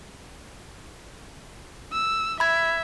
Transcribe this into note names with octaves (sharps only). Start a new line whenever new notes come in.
E6
E5 B5 G#6